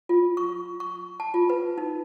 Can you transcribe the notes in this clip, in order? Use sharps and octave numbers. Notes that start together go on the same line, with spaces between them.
F4
C#6
C#6
A5
F4
B4
D#4